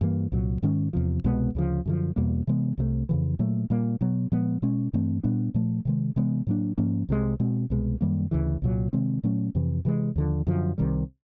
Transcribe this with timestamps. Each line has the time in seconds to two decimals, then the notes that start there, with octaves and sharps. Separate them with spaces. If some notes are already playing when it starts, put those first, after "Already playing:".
0.01 G2 E3 G3 A#3
0.32 C2 A#2 F#3
0.62 G#2 D#3 G#3 C#4
0.93 E2 C3 F3
1.24 C2 B2 G#3 B3
1.55 D2 C#3 F3
1.86 F#2 D3 F3
2.16 E2 B2 G3 A#3
2.47 C3 E3 G#3 B3
2.78 C2 C3 E3 A3
3.09 F2 C#3 E3
3.39 A#2 F#3 A3
3.70 A#2 G3 A#3
4.01 B2 F#3 B3
4.32 A#2 F3 G#3 B3
4.62 B2 G#3 C#4
4.93 G2 E3 A3 C4
5.23 A#2 G3 B3 D4
5.54 A#2 F3 A3
5.85 C3 D#3 G#3
6.16 C3 E3 G#3 B3
6.47 A2 F#3 A#3 D4
6.78 G#2 F3 A#3 C#4
7.09 C2 C3 E3 G#3
7.40 B2 G#3 C4
7.70 C2 B2 G#3
8.01 F#2 D#3 G3 A#3
8.31 D2 C#3 E3
8.62 C2 A#2 F#3
8.93 C3 D#3 G#3 C4
9.23 A#2 F#3 A3 C#4
9.55 F2 C3 E3
9.85 C3 E3 G#3
10.16 D#2 D3 F3
10.47 F#2 D3 F3
10.78 C2 C3 D#3 G3